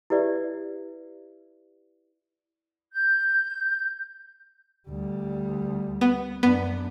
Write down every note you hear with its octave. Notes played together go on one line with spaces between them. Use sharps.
E4 G4 B4 D5 E5
G6
D2 G3
B3
F#2 B3 D4